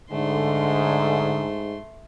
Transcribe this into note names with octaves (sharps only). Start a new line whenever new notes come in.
G#2 D3 A3 C6